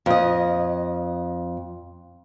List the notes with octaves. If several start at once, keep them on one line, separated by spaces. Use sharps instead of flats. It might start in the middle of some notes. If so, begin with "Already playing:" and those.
F2 D#5